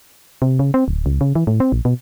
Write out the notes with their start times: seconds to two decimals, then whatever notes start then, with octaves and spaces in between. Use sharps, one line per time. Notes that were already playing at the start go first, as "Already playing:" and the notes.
0.42 C3
0.59 C#3
0.74 C4
0.88 D1
1.06 C#2
1.21 C#3
1.35 E3
1.47 A2
1.60 C4
1.72 A#1
1.85 B2